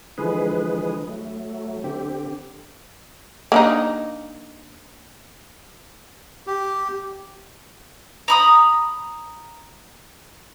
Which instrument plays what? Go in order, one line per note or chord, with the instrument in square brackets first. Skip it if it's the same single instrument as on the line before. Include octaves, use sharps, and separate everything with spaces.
[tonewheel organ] D3 E3 F3 G#3 G#4 B4
F#3 A3
D3 C4 G4
[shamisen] A#3 D4 D#4
[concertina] G4
[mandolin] A#5 B5 D#6